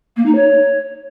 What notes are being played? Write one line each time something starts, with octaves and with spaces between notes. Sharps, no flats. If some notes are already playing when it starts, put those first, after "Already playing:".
A#3
D#4
C#5